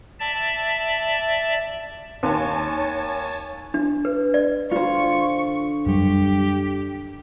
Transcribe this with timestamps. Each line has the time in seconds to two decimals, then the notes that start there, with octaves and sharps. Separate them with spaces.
0.20 D5 E5 A5
2.23 D#2 C#5 G#5 A5
3.74 D4
4.05 B4
4.34 D5
4.71 D3 F4 C5 C#6
5.86 F#2 F#3 G3 G4